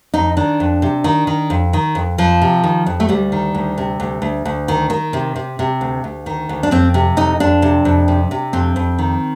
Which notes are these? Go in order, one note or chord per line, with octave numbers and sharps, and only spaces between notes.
F2 D#4
D#3 D4
F2
C3
D#3
D#3
F2
D#3
F2
F2 F3
C3
D#3
F2
A3
D2 G3
D#3
D2
C3
D2
D2
D2
D#3
D#3
C3
C3
C3
D2
D2
D#3
D2
D4
F2 C4
C3
F2 D#4
F2 D4
C3
F2
C3
C3
F2 C4
F2
D#3